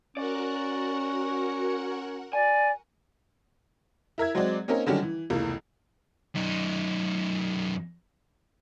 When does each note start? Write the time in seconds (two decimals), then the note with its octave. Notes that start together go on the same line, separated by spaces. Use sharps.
0.17 C#4 F#4 A#4 D5 F#5
2.33 D5 G#5
4.18 E4 A#4 E5 G#6
4.35 F#3 G#3 C4 F#4 D5
4.68 A#3 C4 C#4 D#4 A#4
4.86 D3 D#3 F#3 G3 C#4 D4
5.03 E3
5.30 F1 C#2 E3 A#3
6.35 F#2 D#4